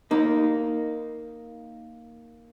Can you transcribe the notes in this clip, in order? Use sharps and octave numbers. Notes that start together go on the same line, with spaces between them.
A#3 D#4